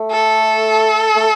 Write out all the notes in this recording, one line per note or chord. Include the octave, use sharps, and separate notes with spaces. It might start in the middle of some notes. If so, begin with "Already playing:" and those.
Already playing: A3
A4
A3